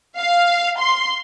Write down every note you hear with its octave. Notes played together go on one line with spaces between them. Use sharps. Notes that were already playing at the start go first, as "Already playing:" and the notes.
F5
C6